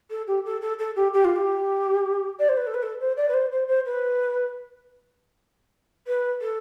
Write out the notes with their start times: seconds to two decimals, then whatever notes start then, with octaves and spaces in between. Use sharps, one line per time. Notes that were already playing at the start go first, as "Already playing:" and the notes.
0.10 A4
0.27 G4
0.45 A4
0.61 A4
0.79 A4
0.96 G4
1.13 G4
1.24 F4
1.35 G4
2.39 D5
2.48 C5
2.57 B4
2.66 A4
2.74 B4
2.82 A4
3.00 C5
3.16 D5
3.28 B4
3.33 C5
3.52 C5
3.67 C5
3.85 B4
6.07 B4
6.41 A4